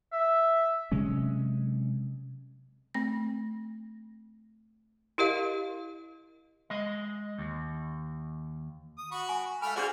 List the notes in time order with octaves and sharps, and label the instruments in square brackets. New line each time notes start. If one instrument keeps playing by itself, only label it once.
[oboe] E5
[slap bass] C3 F#3 G#3 C#4
[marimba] A3 C4 A#6
[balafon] E4 G4 A#4 D#5 F5
[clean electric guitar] G#3 D#5
D#2
[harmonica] D#6
F#4 B5 C#6
[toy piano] G#5
[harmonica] A3 B5 F6 [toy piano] F5 G#5
[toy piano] D4 G#4 D5 [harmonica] F4 F#4 C5